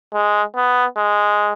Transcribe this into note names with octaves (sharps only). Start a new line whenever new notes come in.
G#3
B3
G#3